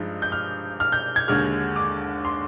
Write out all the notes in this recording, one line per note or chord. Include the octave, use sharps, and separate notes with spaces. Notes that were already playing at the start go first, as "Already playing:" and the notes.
Already playing: G2 F3 G#3 D#4
G6
F6
F6
G6
G#6
D#2 D3 G#3 F6
D6
C6